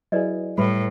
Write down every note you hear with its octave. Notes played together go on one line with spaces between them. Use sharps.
F#3 E4 G#4 B4 D5 D#5
A2 G3 B4 E5 B5